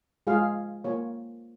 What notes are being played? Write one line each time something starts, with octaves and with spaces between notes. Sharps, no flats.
G#3 F4 G#4 F5
A#3 F4 C#5